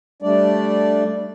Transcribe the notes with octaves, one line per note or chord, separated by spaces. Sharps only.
G3 A3 D4 D5